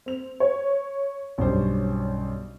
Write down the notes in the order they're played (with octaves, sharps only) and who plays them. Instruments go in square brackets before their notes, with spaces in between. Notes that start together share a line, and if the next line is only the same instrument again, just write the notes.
[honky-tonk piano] C4 F7
C#5
[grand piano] B1 G2 C5 [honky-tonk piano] C#4